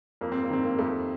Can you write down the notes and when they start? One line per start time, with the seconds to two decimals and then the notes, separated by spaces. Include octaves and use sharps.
0.21 F2 A#3
0.32 C4
0.43 A#3
0.50 D#3 C4
0.64 A#3
0.79 F2 A3